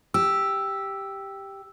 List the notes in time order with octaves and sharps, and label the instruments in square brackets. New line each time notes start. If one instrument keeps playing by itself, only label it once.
[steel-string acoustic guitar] G4 [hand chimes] E6